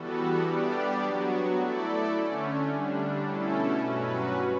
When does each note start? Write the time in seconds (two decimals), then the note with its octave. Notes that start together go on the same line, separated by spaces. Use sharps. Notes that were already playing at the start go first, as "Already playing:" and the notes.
Already playing: E3 G3 B3 F#4 A4
0.44 G3 B3 D4 G4 D5
1.01 F#3 B3 F#4
1.57 A3 E4 A4 D5
2.13 D3 A3 C#4
2.69 D3 G3 D4
3.25 B2 A3 C#4 E4 A4
3.80 G2 F#3 C#4 F#4 B4